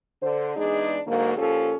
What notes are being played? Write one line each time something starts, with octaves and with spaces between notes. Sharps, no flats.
D3 C5
E2 G#3 D4 D#4 G#4 D5
G#2 D3 F#3 A#3
A#2 F3 C#4 G4 A4